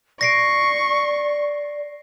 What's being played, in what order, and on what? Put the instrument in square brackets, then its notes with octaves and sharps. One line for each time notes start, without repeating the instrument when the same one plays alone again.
[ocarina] D5 [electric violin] C#6 [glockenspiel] A#6 C7 D7